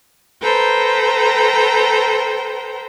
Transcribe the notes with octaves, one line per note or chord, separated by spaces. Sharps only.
A4 B4 C5 G5 A#5